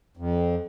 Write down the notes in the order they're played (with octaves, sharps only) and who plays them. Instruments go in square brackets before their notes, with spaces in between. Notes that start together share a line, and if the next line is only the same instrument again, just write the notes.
[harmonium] F2